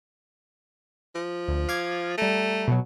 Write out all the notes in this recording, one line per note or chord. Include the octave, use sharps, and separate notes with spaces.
F3
D2
F5 D6 G#6
G3 A3 A#5
B2 F#3